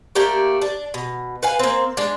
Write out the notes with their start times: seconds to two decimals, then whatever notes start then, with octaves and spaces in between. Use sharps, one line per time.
0.15 A3 A#3 D4 G4
0.62 D4
0.94 B2
1.43 B4 F5 G#5
1.59 A#3 C4
1.97 G#3 D4